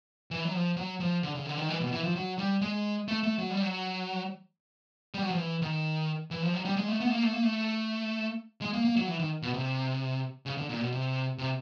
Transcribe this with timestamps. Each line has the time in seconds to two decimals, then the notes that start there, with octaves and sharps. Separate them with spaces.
0.31 E3
0.45 F#3
0.54 F3
0.77 F#3
1.00 F3
1.23 D3
1.35 C#3
1.46 D3
1.57 D#3
1.69 E3
1.81 B2
1.92 E3
2.04 F3
2.15 F#3
2.38 G3
2.61 G#3
3.08 A3
3.23 A3
3.38 F#3
3.51 G3
3.62 F#3
5.14 G3
5.22 F#3
5.30 F3
5.38 E3
5.62 D#3
6.31 E3
6.42 F3
6.54 F#3
6.65 G3
6.77 G#3
6.88 A3
7.00 B3
7.07 A3
7.12 A#3
7.23 A3
7.33 A#3
7.43 A3
8.61 G#3
8.73 A#3
8.85 A#3
8.96 F#3
9.08 E3
9.19 D#3
9.42 B2
9.54 C3
10.46 C#3
10.58 D3
10.69 A#2
10.81 B2
10.93 C3
11.38 C3